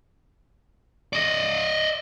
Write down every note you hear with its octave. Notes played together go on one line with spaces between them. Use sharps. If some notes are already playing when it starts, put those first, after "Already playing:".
D5 D#5